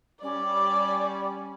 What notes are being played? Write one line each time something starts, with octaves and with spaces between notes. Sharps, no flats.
G3 C#4 D5